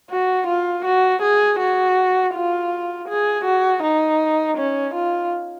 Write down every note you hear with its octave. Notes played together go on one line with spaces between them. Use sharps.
F#4
F4
F#4
G#4
F#4
F4
G#4
F#4
D#4
C#4
F4